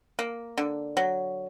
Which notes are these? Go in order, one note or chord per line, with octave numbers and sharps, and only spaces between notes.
A#3
D3
F#3